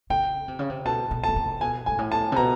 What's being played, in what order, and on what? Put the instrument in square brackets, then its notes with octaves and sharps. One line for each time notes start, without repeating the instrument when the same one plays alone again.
[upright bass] C#3 [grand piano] G5
[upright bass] C3
C#3
C3
[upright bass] B2 [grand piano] A5
[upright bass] B2
[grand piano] A5
[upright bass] B2
C3
[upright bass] B2 [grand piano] G#5
[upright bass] G#2 [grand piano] G#5
[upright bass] A2
[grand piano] A5
[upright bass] C3
[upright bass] B2 [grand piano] A#5